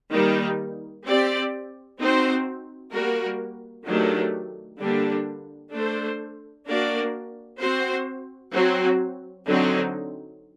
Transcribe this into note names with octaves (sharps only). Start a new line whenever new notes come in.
D#3 G3 A#3 D#4
C4 G4 D5
C4 D#4 F#4 C5
G3 A#3 F#4 A#4
D#3 F#3 A3 D4 G4
D3 G3 A#3 D4 G4
A3 D4 A4 C5
A#3 D4 F#4 A#4 D5
C4 F#4 C5
F#3 C4 F#4
D3 F#3 C4 D#4